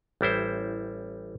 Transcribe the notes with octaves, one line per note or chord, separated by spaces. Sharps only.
A1 G3 E4 C5